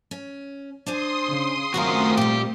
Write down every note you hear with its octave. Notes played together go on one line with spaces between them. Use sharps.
C#4
D4 C5 G#5 C6 D#6
C#3
F#2 D#3 A3 C4 F4 F#4 A#4
A#2 G3 G4